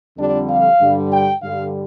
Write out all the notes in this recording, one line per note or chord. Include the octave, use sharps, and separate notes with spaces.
F2 D3 G3 D4
F5
G2 D3 G3
G5
G2 D3 G3 F5